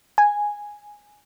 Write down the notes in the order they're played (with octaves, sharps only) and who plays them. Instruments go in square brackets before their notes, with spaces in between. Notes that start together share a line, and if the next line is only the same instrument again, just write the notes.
[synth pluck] G#5